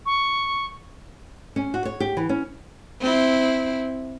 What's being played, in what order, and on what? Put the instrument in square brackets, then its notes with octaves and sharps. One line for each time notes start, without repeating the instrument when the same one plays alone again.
[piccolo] C#6
[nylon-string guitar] C#4
F#4
C#5
G4
E3
C#4
[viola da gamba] C4 E4